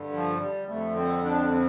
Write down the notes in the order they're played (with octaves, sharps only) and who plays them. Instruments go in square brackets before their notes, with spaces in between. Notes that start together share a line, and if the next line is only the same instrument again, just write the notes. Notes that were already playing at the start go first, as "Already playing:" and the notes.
Already playing: [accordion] G2 D3
F3
G3
F2 D3 A3
C4
D4
C4